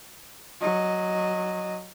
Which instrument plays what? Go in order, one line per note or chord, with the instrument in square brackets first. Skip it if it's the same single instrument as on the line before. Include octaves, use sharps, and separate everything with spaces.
[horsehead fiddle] F#3 D#5